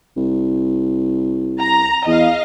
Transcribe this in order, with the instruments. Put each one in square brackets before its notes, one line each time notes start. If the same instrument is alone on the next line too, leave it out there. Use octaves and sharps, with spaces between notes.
[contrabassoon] C2
[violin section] A#5
[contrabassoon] E2 [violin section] D#5 F5